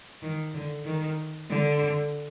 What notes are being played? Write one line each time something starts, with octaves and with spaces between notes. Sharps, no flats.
D#3
D3
D#3
D3